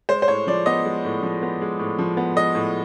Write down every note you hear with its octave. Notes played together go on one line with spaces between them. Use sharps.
G#3 C5
C5
A2 C#5
F3 D5
B3 D#5
G#3
A2
F3
B3
G#3
A2
F3
B3
G#3 D#5
A2